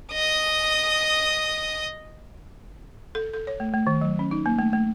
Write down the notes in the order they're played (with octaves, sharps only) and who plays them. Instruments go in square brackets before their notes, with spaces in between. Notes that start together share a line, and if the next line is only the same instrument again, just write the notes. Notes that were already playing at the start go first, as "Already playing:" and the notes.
[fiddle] D#5 D#6
[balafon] A4
A4
C#5
A3
A3
D#3
F#3
C#4
D#4
A#3
A3
A3